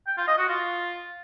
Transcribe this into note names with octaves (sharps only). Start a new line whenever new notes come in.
G5
F4
D#5
F#4
F4